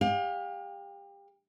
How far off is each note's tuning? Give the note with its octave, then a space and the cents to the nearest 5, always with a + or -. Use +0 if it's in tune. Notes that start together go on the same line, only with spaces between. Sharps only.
G4 +30 F5 +35